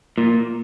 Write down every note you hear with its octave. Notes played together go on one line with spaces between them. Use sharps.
A#2